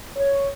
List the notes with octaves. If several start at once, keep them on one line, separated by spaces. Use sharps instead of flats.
C#5